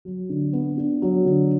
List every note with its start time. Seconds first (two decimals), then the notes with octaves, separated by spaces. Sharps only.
0.05 F#3
0.30 D3
0.53 B3
0.77 D4
1.02 F#3
1.25 D3